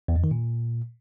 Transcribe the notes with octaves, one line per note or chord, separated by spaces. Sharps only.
E2
F2
D#3
A#2